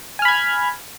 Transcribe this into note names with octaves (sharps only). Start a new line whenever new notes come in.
G#5 B5 F6 G#6